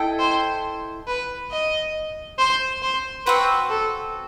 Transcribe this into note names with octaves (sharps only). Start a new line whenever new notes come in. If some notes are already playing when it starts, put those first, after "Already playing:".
Already playing: E4 A4 D#5 G5
C5
B4
D#5
C5
C5
C4 F#4 B4 C5
A4